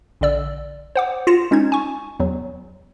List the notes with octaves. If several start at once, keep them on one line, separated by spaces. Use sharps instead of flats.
A#1 D3 D5 E6
C5 F#5 D6
F4 A#6 C#7 E7
G#3 C#4 D#4 G#6
G#5 C#6
E2 F#3